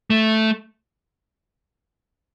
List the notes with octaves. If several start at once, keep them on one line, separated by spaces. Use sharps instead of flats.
A3